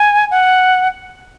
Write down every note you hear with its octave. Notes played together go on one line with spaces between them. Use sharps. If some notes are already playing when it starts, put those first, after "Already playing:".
Already playing: G#5
F#5